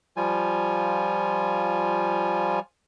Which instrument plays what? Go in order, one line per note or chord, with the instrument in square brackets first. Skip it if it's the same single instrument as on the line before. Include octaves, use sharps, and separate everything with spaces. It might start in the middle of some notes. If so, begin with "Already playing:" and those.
[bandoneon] F3 G3 F4 G#5